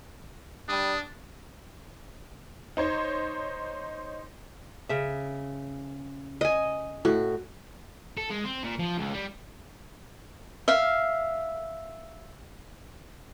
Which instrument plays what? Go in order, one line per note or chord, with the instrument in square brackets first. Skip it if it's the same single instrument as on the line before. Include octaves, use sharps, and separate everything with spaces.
[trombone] G3 [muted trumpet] D4 [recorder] D#6
[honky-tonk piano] D#4 C5 C#5
[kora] C#3 E5
[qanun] D#5 G#5
[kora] A2 [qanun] F#4
[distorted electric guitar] A4
G#3
C4
A#2
F3
C#2
G3
[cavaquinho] E5 F5